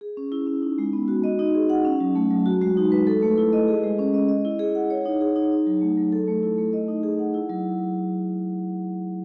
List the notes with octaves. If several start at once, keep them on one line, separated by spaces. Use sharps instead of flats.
G#4
C#4
E4
C#4
D#4
G#3
B3
F#4
D#5
D#4
G#4
F#5
C#4
F#3
A3
F#3
F#4
G#3
D#4
B4
A4
A3
E4
D#5
G#4
G#3
C#4
D#5
D#5
E4
G#4
F#5
C#5
D#4
G#4
D#4
D#4
F#3
A3
F#3
A4
A3
E4
A3
D#5
D#4
G#4
F#5
E4
F#3